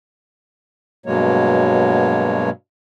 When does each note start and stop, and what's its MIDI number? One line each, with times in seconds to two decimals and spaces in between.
1.06 2.50 43
1.06 2.50 47
1.06 2.50 54
1.06 2.50 56
1.06 2.50 58
1.06 2.50 73